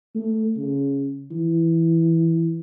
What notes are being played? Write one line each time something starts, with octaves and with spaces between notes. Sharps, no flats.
A3
C#3
E3